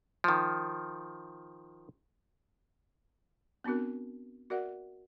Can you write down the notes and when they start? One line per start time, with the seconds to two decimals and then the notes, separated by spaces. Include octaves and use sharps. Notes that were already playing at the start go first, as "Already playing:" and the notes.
0.24 D#3 F3
3.64 B3 C4 D4 F#4 A#4
4.50 F#4 A#4 D5 E5 F#5